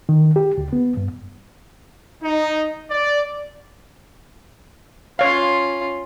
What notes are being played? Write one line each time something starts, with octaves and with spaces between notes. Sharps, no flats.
D#3
G4
D2
B3
G2
D#4
D5
C#4 F4 C#5 F5